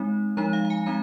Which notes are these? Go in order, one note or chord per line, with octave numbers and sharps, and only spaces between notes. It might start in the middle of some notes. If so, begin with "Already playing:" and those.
Already playing: G#3 C4 D#4
F3 G#3 D#4 A#5
F5
F5
G#5
G#3 C4 D#4 A#5